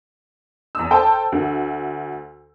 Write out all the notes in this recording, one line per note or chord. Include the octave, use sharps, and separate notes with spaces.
E2 E6
A4 C5 G5 A5
D2